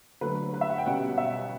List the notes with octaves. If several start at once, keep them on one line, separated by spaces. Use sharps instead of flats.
D3 F#3 A3 B4
B4
E5
F#5
G5
B2 G3 C#4 F#5
E5